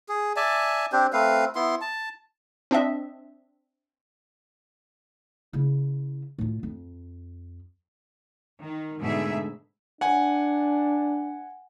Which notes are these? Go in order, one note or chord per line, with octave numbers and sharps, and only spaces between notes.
G#4
D5 E5 G#5 A5
C4 D4 G4 C5
A3 C4 B4 F5
B3 E4 C6
A5
C4 D4 D#5 E5
C#3 E4
A2 F4
F2
D#3
G#2 B2 D3 A3 G#4 E5
D4 F#5 G#5